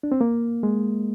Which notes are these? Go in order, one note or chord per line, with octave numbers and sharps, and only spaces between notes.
D4
C4
A#3
G#3